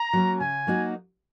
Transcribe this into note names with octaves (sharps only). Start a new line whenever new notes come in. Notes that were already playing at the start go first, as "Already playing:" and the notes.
Already playing: A#5
F#3 A#3 C#4
C#3 G#5
F#3 A#3 D#4 F#4